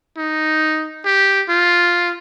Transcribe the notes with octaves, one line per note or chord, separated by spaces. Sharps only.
D#4
G4
F4